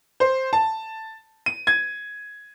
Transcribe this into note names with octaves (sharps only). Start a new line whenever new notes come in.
C5
A5
D#7
G#6